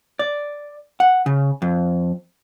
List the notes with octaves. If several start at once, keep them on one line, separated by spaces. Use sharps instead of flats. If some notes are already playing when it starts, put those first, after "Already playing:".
D5
F#5
C#3
F2